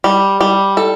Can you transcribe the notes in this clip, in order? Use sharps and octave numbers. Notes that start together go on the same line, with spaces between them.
G3
G3
A4